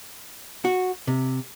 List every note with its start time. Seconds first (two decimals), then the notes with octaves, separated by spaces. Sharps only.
0.65 F#4
1.07 C3